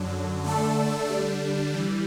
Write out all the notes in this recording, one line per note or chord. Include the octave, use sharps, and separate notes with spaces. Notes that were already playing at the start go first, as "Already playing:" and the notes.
Already playing: F#2 D3 F#3
D3 A3 D4 A4
D3 G3 D4
E3 G3